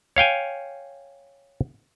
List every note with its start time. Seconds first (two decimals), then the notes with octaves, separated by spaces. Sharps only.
0.16 C#5 F5 G5 G#5